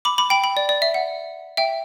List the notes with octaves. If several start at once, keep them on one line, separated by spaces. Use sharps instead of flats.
B5 D6
B5 D6
G5 B5
G5 B5
D5
D5
E5
F#5
E5 G5